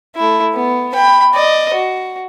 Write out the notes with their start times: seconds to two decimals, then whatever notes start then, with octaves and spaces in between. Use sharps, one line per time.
0.16 A3 E4
0.55 B3
0.94 G5 B5
1.34 D5 D#5
1.74 F#4